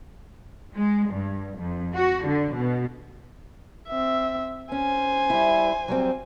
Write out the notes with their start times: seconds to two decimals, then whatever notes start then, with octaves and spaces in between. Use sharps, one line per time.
0.75 G#3
1.11 G2
1.58 F2
1.95 F#4
2.25 D3
2.55 B2
3.88 C4 E5
4.72 C#4 C5 G#5
5.30 G3 E4
5.88 F#3 G3 C4